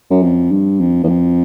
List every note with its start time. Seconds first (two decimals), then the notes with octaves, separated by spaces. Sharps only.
0.11 F#2
0.23 F2
0.51 G2
0.80 F2
1.04 E2
1.08 F2